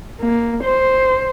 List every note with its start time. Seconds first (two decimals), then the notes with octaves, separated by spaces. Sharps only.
0.21 A#3
0.64 C5